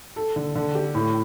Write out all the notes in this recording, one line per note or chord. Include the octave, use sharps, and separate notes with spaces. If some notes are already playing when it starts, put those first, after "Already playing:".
A4
D3
D3
G4
A2